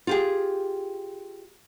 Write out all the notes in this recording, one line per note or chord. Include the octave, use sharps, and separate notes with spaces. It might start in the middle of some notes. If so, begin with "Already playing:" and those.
F4 G4 G#4